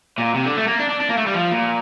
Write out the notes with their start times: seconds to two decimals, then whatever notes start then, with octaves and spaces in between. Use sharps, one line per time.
0.18 A#2
0.34 C3
0.46 D3
0.58 A3
0.68 A#3
0.80 D4
0.90 D4
1.01 D4
1.10 A#3
1.18 A3
1.27 G3
1.35 F3
1.51 A#2